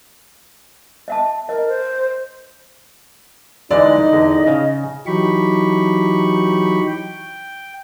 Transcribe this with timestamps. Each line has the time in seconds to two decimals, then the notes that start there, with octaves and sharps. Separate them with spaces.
1.08 D#5 E5 A5
1.49 A#4 D#5
1.68 C5
3.71 D3 E3 G#3 D#4 D5 D#5
4.13 E2 D3
4.47 C#3
5.06 E3 F#3 D#4 G4 B5 C#6
6.88 G5